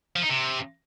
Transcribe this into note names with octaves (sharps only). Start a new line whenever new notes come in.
F3
D#4
C3